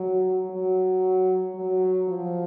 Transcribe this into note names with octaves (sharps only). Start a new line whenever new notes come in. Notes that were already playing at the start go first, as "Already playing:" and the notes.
Already playing: F#3
F#3
F#3
F3